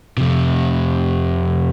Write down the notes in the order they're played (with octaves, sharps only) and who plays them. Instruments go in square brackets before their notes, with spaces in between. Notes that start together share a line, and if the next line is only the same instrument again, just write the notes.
[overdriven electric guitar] F2 C3